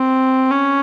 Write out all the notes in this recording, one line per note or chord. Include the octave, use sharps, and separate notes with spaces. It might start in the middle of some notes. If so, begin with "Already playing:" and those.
Already playing: C4
C#4